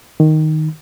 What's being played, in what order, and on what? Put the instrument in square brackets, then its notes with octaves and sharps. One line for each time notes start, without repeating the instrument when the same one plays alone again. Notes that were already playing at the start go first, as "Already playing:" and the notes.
[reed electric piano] D#3